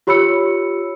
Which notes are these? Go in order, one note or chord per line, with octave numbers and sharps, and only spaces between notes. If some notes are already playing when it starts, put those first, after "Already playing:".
F4 G4 C#5 B5 E6 C#7